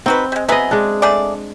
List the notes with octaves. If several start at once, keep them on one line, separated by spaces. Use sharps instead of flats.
C4 D#4 F#4 B4
G3 G#3
F#3 B3 G#4 D#5 E5
G#3 D4
A3 G#4 D5